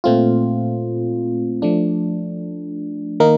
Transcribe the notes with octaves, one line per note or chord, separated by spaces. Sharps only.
A#2 A3 C4 F4
F3 A3 D4
D#3 A#3 D#4 A#4